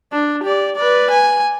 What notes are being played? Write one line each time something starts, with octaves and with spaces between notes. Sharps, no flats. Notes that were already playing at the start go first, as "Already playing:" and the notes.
D4
G4 D5
B4 D5
G#5